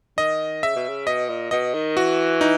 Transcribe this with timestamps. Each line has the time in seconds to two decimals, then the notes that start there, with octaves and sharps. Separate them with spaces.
0.18 D#3 D#5
0.63 C#3 E5
0.76 B2
0.88 C#3
1.07 B2 D#5
1.29 A#2
1.51 B2 D#5
1.74 D#3
1.97 E3 F#4
2.41 D#4